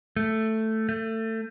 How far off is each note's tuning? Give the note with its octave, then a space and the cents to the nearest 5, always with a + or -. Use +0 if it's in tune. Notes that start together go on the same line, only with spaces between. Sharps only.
A3 +5
A3 +25